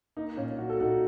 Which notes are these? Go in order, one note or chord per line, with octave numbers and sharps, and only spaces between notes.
A#3 D#4
A#2 C#4 F4
F#3 F#4
A4
A#2 D#4 F#4